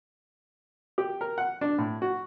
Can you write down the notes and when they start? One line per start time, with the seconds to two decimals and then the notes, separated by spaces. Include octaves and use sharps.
0.98 G4
1.21 A#4
1.38 F#5
1.61 D4
1.78 A2
2.02 F#4